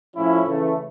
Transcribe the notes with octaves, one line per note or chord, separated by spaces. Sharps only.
A2 F3 C#4 E4
C#3 E3 A3